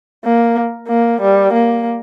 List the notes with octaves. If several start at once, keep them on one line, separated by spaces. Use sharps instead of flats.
A#3
A#3
G3
A#3